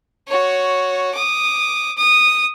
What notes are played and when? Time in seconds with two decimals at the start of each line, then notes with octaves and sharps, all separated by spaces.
0.28 F#4 C#5
1.15 D6 D#6
1.97 D#6